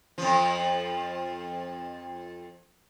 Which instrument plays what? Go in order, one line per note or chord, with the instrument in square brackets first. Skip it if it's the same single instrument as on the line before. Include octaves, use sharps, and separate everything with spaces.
[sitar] F2 F3